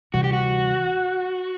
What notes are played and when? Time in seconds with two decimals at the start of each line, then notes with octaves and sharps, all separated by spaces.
0.13 D2 C3 E3 G3 F#4
0.24 G4
0.33 F#4